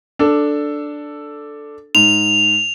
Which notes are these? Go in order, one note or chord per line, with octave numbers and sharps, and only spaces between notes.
D4 A4
G#2 F7